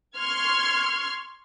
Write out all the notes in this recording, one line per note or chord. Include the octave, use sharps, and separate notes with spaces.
C6 C#6 F6 G#6